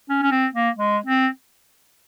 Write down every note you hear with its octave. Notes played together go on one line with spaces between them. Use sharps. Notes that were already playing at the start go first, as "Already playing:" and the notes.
C#4
C#4
C4
A#3
G#3
C4